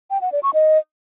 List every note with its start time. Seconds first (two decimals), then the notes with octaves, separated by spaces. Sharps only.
0.10 G5
0.21 F#5
0.32 D5
0.43 C#6
0.54 D#5